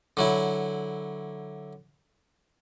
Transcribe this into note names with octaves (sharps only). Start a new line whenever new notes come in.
D3 F#3 E4